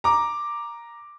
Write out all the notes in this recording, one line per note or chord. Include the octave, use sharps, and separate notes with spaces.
A#5 D6